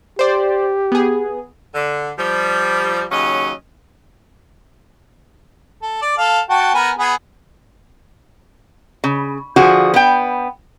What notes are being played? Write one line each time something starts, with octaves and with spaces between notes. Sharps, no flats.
G4 C5 D5
B3 G#4
D3
F3 G3
D#2 C#3 F#3 C#4 D#5
A4
D5
A4 F5
F#4 G5 A5
B3 A#4 G#5
B3 G#4
C#3
D3 F3 F#4 G#4
B3 G5